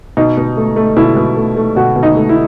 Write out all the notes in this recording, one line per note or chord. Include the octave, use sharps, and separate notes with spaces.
B2 D#4
B2
A3
A3
B2 E4
B2
A3
A3
B2 F#4
B2
D#4
A3
E4